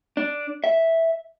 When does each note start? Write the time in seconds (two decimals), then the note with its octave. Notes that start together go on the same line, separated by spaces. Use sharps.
0.17 D4
0.64 E5